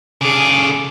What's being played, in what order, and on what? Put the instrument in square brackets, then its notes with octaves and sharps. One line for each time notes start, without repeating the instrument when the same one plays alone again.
[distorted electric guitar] C#3 A4 [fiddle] G#4 D6